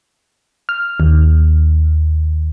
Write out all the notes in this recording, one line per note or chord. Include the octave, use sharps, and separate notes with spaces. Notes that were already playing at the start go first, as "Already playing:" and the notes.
F6
D#2